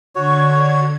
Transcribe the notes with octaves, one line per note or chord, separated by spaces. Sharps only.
D3 F#4 C#5 G#6